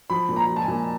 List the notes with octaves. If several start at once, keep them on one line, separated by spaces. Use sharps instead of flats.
F3 B5
A#2
A#5
F3
A5
G#5
A#2